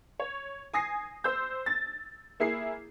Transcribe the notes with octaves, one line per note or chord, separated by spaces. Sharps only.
C#5
G#5 D#6 A#6 C7
C5 E6 G6
A6
A#3 E4 G#4 C7